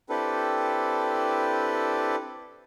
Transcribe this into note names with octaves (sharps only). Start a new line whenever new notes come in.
C4 D4 E4 G4 A4 B4